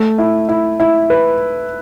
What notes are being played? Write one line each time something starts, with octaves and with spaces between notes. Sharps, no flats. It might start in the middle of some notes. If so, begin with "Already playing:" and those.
Already playing: A3
E4
E4
E4
B4